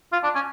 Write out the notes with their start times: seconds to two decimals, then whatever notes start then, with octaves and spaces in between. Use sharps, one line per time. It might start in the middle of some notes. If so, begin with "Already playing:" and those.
0.13 F4
0.24 D4
0.35 C#4